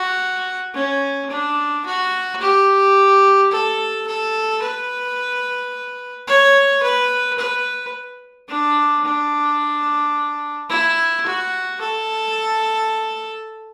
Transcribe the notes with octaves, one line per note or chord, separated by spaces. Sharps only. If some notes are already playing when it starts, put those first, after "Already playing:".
Already playing: F#4
C#4
D4
F#4
G4
A4
A4
B4
C#5
B4
B4
D4
D4
E4
F#4
A4